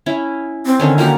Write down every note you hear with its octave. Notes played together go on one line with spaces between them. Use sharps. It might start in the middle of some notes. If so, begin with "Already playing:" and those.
C#4 E4
C4
D3 D#3 C#4
A#3 F4 F#4 G5